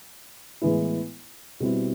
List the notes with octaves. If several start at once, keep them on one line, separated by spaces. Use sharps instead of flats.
A2 E3 G#3 B3 E4
B2 G3 C4 E4